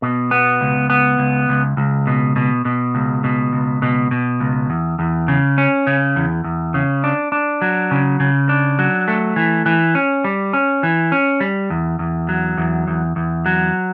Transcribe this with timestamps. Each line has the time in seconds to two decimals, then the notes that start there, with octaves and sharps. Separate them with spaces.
0.02 B2
0.31 B3
0.61 C#2
0.90 B3
1.19 C#2
1.49 C#2
1.77 C#2
2.07 B2
2.36 B2
2.65 B2
2.95 C#2
3.24 B2
3.53 C#2
3.82 B2
4.11 B2
4.40 C#2
4.70 E2
4.99 E2
5.28 C#3
5.58 C#4
5.87 C#3
6.16 E2
6.44 E2
6.74 C#3
7.04 D4
7.32 D4
7.62 F#3
7.91 C#3
8.20 C#3
8.49 D4
8.79 F#3
9.08 A3
9.36 E3
9.66 E3
9.95 C#4
10.24 G3
10.53 C#4
10.83 E3
11.12 C#4
11.40 G3
11.70 E2
11.99 E2
12.29 F#3
12.58 E2
12.88 E2
13.16 E2
13.46 F#3